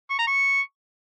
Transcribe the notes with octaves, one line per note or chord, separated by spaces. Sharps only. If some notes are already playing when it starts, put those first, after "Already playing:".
C#6
A#5
C#6